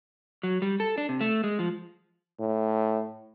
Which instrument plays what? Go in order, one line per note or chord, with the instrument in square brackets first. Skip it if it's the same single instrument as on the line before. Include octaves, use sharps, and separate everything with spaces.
[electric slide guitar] F#3
G3
A4
D4
C3
A3
G#3
F3
[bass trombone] A2